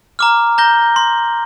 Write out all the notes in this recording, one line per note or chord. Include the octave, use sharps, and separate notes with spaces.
A#5 D6 F6
A#5 G6 A#6 G7
C6